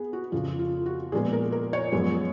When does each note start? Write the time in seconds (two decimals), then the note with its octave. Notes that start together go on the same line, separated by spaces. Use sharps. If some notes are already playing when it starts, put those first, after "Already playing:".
Already playing: B3 G#4
0.13 F#4
0.32 F2 C#3 F3 F4
0.59 F4
0.86 F#4
1.12 A#2 F3 G#3 B3 G#4
1.33 A#4
1.52 A#4
1.73 C#5
1.92 F#2 F3 G#3 B3